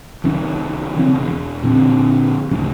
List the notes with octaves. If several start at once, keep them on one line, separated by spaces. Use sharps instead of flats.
C2 D#3 C#4
C#3 E3 C4
E1
A#2 D3 C4
A1 D2 C#3